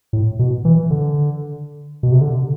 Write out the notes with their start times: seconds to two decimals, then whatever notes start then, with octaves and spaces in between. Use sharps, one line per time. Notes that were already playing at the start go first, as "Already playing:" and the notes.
0.13 A2
0.39 B2
0.65 E3
0.90 D3
2.03 B2
2.12 C3
2.21 D3